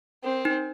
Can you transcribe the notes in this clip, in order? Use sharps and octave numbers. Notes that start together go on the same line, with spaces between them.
C4 A#4
D#4